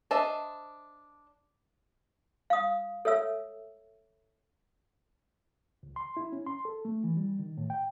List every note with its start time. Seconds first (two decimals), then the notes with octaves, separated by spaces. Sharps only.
0.11 D4 C5 D#5 E5 A5
2.50 F5 D#6
3.05 A4 C#5 E5 E6
5.83 C#2
5.96 C6
6.17 E4
6.32 C#4
6.47 C6
6.65 A4
6.85 A3
7.04 E3
7.17 G3
7.39 D#3
7.57 A2
7.70 G5